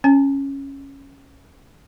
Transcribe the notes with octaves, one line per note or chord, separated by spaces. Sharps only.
C#4 G#5